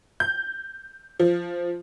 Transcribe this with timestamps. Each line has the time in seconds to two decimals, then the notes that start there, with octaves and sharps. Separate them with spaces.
0.20 G6
1.19 F3